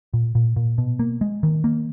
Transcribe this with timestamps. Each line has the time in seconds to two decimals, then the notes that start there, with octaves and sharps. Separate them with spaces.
0.14 A#2
0.35 A#2
0.56 A#2
0.78 B2
0.99 A#3
1.21 G#3
1.43 D#3
1.64 A#3